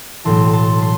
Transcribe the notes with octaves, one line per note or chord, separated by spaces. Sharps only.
B1 A2 E3 A5 C6
A5 C6
C6